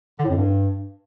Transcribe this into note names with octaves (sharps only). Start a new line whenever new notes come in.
D3
A2
F2
G2